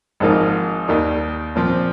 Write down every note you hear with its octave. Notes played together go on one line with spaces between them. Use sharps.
G#1 G#2 F3 A#3 D#4
D#2 D#3 G3
A#2 F3 C4